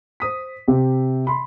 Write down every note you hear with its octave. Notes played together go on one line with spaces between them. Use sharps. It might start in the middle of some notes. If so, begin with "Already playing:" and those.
C5 D#6 B6
C3 C4 G4
B5 C6